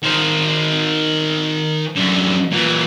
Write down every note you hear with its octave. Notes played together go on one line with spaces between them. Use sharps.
D#3 C5
F#2 D3
A#2 E3